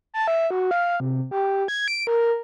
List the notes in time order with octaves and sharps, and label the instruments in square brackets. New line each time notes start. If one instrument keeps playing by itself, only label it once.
[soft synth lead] A5
E5
F#4
F5
C3
G4
G#6
D7
A#4